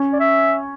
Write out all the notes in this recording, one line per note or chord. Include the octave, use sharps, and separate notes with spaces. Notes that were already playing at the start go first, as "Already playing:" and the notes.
Already playing: C#4
D5
E5